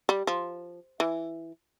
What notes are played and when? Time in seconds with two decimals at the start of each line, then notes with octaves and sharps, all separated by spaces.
0.09 G3
0.27 F3
1.00 E3